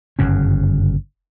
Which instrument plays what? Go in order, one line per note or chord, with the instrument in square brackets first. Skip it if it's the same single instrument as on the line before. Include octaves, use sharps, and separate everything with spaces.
[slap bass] G1 F#2 C#3 C#4